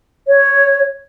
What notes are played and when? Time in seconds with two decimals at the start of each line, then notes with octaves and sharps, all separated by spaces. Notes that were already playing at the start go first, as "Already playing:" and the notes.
0.28 C#5